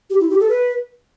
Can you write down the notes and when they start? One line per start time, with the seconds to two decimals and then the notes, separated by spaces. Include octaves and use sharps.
0.10 G4
0.20 E4
0.30 G4
0.40 A4
0.49 B4